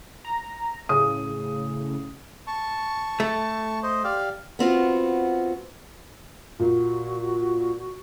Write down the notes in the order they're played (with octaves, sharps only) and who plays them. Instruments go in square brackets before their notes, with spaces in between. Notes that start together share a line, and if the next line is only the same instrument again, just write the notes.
[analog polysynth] A#5
[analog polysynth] A2 C#3 [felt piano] D#6
[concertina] A5 C#6
[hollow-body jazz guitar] A3
[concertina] C5 D#5
G4 D5 F5
[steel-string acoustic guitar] B3 C4 F4 F#4
[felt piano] A#2 [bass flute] F#4